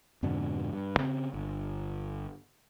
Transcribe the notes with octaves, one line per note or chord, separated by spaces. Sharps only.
F2 G#2 B2 D3
G2
C#3 C4
G1